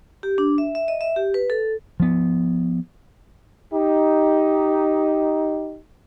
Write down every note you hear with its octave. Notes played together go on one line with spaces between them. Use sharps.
G4
D4
E5
E5
D#5
E5
G4
B4
A4
F3 B3
D#4 G4